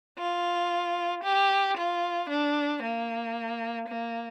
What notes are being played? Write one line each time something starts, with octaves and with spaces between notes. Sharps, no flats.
F4
G4
F4
D4
A#3
A#3